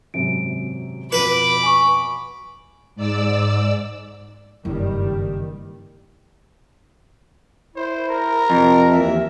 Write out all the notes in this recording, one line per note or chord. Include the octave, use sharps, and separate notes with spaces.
G#1 F#2 C3 D7
F2 B2 B4 B5 D6
G#5 C#6
G#2 D5 E6
F#1 G2 D#3 G3
E4 C5
A#4
F2 C3
D#2 E3 E5